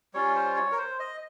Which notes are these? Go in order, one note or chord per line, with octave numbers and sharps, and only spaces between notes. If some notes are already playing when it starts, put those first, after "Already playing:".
G3 C#4 F4 C#5
C5
C#5
A#4
C5
D#5